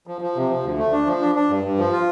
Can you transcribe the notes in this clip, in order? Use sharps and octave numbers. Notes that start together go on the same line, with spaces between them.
F3
F3
C3
F3
D2
A3
D4
F3
D4
D4
G2
G2
F3
F4